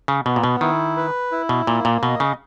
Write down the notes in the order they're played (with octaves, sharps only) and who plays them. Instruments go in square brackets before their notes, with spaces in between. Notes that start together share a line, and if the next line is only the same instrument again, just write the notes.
[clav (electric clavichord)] C#3
[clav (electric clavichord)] B2 [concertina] B3
[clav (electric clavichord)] A#2
B2
[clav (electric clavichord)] D#3 [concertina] E4
[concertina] B4
E4
[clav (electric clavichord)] B2
[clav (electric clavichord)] A#2 [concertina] A#3
[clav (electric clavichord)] A#2
[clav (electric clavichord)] B2 [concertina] D#5
[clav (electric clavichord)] C#3